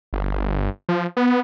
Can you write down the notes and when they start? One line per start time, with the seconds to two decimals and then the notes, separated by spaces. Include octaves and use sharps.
0.13 G1
0.89 F3
1.17 B3